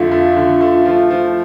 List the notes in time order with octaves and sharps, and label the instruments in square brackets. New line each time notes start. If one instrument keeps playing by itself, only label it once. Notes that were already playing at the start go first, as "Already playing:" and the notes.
Already playing: [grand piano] F2 D3 A3 [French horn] F4
[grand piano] A3
D3
A3
F3
F3